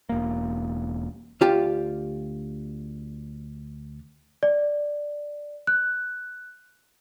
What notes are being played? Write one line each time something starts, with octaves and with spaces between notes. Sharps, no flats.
E1 A#3
D2 F4 G4 A5
D5
F#6